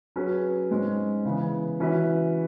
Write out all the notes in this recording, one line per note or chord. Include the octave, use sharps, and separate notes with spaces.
F#3 C#4 G#4 B4
G#2 G#3 C#4
C#3 E3 B3
E3 C#4 F#4 B4 E5